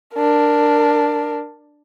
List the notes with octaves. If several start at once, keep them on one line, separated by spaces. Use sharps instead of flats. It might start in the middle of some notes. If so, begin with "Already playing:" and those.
D4 A#4